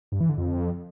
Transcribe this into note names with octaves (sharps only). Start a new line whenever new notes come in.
G2
E3
D3
F2